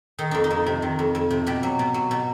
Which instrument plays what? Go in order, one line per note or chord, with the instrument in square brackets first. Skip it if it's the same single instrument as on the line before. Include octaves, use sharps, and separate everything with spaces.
[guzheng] D#3 D#4
F2 D4
D#4
F2
C3
D#3
F2
F2
C3
B2 G4
F#3
B2
F#3
B2